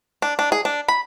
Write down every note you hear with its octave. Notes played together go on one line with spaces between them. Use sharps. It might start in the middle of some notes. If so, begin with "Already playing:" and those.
D4
D4
G#4
D4
B5